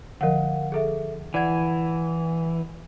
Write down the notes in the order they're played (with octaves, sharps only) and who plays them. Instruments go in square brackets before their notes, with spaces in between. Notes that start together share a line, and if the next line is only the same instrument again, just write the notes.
[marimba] D3 F3 [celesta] A#4 F5 F#5
[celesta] G#4 A4 E5
[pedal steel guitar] E3 [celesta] D5 F#5 G#6